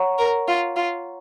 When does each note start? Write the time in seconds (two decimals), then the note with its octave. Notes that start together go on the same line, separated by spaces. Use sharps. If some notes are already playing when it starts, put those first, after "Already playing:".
Already playing: C#5 F#5 A#5 C#6
0.18 A#4
0.48 F4
0.76 F4